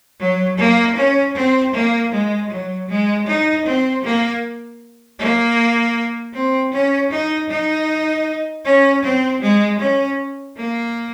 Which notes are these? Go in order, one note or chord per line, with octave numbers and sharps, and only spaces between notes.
F#3
A#3
C#4
C4
A#3
G#3
F#3
G#3
D#4
C4
A#3
A#3
C4
C#4
D#4
D#4
C#4
C4
G#3
C#4
A#3